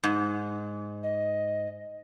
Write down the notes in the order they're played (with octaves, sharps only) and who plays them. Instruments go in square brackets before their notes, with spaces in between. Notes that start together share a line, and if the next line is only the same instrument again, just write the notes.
[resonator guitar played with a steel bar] G#2
[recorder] D#5